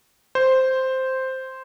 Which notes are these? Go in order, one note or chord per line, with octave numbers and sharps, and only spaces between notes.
C5